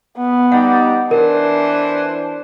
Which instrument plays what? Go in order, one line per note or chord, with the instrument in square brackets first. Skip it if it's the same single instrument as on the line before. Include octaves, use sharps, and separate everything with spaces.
[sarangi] B3
[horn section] G3 D#4 G4 [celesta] F#5
[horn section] E3 C5 [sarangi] D4 [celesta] A#4